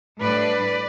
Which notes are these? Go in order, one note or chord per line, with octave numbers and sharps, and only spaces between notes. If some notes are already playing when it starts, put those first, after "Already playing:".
A2 G3 D4 B4 D5